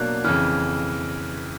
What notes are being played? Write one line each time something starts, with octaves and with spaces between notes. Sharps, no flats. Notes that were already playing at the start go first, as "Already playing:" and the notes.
Already playing: B2 F#3 A#3 D4 F#6
F2 C#3 E3 F6